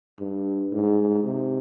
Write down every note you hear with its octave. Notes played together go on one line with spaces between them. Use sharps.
G2
G#2
C3